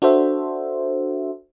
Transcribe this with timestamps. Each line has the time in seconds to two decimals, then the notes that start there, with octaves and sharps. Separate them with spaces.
0.02 D4 F#4 A4 C5 E5